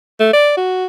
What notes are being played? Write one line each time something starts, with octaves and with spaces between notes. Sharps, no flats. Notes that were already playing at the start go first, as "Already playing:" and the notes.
A3
D5
F#4